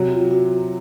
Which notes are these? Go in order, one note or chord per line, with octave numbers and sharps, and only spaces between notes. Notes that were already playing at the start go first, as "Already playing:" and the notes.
Already playing: C3 F#3
F4
F#4